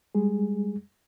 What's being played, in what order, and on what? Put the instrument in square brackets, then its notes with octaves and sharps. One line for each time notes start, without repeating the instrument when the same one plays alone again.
[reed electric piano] G3 G#3 G#4